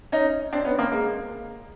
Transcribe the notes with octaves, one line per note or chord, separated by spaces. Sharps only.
C#4 D#4
C4 D4
B3 C#4
A#3 C4
G#3 A#3